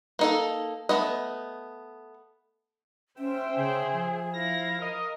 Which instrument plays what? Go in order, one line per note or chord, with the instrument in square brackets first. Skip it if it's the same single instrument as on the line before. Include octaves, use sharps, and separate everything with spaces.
[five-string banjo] A#3 D#4 A4
A3 B3 D#5
[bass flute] C#4 [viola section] C5 E5 G5
[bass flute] C#3 [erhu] G#4
[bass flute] F3
[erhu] E4 [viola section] F5 [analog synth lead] A#6
[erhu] A#4 [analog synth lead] D#5